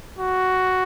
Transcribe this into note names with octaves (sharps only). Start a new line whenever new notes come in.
F#4